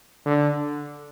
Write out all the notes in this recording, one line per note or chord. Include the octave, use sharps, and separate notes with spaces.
D3